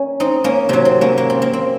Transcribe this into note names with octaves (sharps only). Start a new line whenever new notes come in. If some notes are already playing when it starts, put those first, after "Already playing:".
Already playing: A#3 C#4
C4 D#4
A#3 C#4
C3 F#3 A#3
C4
A#3 C#4
A#3
C4
A#3
C4